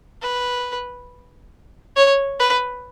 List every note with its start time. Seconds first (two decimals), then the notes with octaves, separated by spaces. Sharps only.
0.22 B4
1.96 C#5
2.39 B4